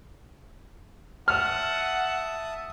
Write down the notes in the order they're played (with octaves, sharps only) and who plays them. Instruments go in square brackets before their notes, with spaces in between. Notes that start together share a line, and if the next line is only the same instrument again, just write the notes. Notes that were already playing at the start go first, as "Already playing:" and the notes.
[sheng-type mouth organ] E5 A5 D#6 [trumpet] F#5 [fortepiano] F6